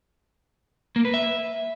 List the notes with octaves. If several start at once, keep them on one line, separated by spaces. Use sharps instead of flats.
A#3
B4
E5